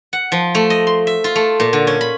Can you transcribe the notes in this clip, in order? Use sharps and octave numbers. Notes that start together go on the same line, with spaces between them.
F#5
F3
A3
D#5
C6
E5
F4
A3
A#2
D3
C#4
B5